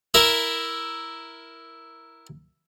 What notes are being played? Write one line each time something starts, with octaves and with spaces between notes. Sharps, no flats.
E4 A#4 E5